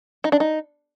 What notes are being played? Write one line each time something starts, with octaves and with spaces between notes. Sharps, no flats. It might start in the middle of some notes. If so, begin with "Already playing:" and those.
D#4
D4
D#4